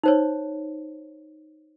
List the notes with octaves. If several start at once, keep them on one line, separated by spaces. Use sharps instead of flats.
D#4 C5 C#5